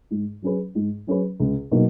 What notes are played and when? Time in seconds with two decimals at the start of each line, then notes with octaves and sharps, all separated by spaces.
0.11 G#2
0.42 F#3 C#4 G#4 B4
0.75 G#2
1.07 F#3 C#4 G#4 B4
1.40 C#2
1.72 B2 F#3 A#3 D#4